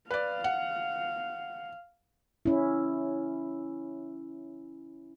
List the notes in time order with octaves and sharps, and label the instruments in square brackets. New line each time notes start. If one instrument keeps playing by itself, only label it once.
[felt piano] B4 D5 [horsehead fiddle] F5
[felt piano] F#5
[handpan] C#4 E4